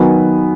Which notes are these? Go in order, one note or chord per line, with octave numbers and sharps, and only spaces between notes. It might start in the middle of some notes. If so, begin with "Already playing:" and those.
Already playing: D#3 F#3 B3 G#5